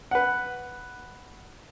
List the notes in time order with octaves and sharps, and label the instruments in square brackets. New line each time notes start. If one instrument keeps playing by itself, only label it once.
[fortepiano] B4 F#5